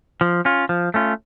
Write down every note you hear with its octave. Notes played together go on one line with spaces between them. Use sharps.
F3
C#4 F4
F3
A3 C#4 F4